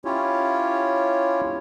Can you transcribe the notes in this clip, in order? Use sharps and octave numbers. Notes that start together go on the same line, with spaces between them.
C#4 E4 F4 G4 C#5